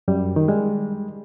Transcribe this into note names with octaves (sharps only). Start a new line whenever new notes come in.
F#2 G3
D#3
G3 G#3